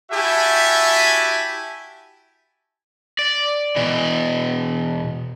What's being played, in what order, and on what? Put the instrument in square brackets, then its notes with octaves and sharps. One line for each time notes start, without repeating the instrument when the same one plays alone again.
[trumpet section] E4 F#4 G4 E5 G#5 A5
[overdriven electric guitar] D5
B2 E3